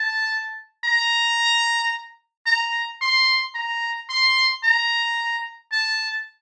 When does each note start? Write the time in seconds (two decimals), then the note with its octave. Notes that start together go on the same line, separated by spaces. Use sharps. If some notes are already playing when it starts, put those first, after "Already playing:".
Already playing: A5
0.85 A#5
2.46 A#5
3.01 C6
3.55 A#5
4.09 C6
4.64 A#5
5.72 A5